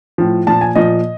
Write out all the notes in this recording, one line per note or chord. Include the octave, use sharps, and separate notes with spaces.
A2 F3
A#2 F3 A5
G#5
A#2 F3 D#5